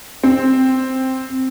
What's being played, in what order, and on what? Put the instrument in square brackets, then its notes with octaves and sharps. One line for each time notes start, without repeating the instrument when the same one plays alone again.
[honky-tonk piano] C4